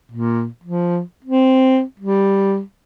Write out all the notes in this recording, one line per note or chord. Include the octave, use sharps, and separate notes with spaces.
A#2
F3
C4
G3